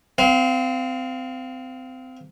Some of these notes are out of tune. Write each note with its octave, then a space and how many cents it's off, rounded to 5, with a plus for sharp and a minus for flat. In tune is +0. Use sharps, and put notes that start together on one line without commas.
C4 -25 F5 +0